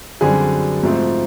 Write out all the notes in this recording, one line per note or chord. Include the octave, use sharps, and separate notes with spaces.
F#2 D3 G3 C4 G#4
G#2 F3 A3 C4